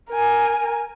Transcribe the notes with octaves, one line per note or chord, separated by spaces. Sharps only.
A#4 G#5